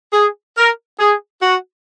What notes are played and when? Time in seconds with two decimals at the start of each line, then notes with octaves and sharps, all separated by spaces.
0.12 G#4
0.56 A#4
0.98 G#4
1.41 F#4